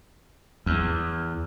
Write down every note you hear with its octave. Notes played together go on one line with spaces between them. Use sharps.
E2